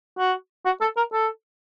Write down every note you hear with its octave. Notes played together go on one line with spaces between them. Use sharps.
F#4
F#4
A4
A#4
A4